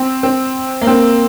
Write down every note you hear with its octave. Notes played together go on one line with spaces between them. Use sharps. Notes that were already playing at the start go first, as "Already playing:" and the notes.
Already playing: C4
C4
A#3
C4